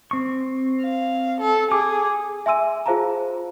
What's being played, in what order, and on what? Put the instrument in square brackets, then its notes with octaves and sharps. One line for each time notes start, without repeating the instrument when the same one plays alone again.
[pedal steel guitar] C4 C#6
[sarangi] F5
A4
[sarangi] G#4 [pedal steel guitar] D6
[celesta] E5 G#5 C6 E6 D#7
F4 G#4 C5 F5 A5 A#5